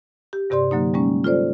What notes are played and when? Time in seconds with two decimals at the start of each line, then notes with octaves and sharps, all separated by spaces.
0.33 G4
0.50 G2 C3 G4 D5 C6
0.71 D3 F#3 A#3 D#4
0.94 G3 G#3 A#3 C#4
1.24 F4 A4 C5 D5